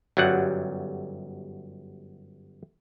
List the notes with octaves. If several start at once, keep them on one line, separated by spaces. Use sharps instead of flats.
G1 F#2 F#3 G3 F#5